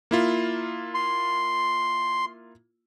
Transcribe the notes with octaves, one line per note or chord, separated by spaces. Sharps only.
A#3 E4 F4
C6